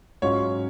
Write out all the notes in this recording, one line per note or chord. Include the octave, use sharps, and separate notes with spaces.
G#2 F#3 C#4 F4 C#5